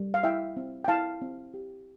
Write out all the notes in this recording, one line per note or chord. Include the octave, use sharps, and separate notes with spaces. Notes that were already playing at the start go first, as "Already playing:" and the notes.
Already playing: G3
F5
E4 E5 G5
C4
G5
E4 F5 A5
C4
G4